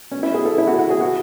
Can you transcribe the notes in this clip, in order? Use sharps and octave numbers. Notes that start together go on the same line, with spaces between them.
C#4
E4
G#4
A4
E4
F#4
F#4
G#4
F#4